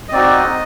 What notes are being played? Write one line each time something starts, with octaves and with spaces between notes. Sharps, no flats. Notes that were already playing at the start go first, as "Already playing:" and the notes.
D#5
C4 D#4 F#4 D5
D#5